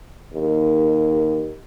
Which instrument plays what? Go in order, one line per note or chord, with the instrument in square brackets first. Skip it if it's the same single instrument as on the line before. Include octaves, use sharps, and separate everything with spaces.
[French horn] D#2